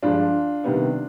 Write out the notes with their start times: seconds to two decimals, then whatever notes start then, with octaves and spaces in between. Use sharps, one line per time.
0.03 G2 F3 G#3 D4 F4
0.64 C3 D#3 G3 B3